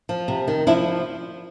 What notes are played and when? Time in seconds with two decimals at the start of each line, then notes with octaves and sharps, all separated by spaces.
0.09 F3
0.28 C3
0.47 D#3
0.67 F3 D4 E4